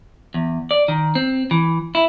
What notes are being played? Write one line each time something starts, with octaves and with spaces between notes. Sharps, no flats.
E2
D5
D#3
C4
E3
E4